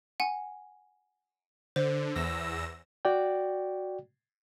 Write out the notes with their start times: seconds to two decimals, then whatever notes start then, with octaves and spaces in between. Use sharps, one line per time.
0.20 F#5 G#5
1.76 D3 C5
2.15 E2 E6 A#6
3.05 F#4 D5 G5